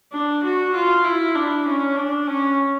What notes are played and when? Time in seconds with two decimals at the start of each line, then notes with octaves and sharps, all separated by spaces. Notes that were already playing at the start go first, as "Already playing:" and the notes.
0.12 D4
0.43 F#4
0.74 F4
1.04 E4
1.35 D4
1.66 C#4
1.97 D4
2.27 C#4